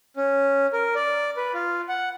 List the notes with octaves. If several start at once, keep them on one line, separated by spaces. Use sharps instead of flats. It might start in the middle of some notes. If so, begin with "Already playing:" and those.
C#4
A#4
D5
B4
F4
F#5